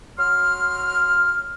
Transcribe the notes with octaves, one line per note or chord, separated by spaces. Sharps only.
F#3 C6 F6